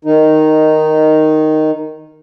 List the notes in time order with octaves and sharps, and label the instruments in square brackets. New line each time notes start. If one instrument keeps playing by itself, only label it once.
[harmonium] D#3 D#4